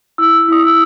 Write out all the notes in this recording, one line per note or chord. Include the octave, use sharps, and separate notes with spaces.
E4 E6
E4 D#6
E6